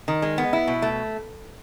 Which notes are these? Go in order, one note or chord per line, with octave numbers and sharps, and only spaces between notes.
D#3
G#3
B3
E4
B2
A3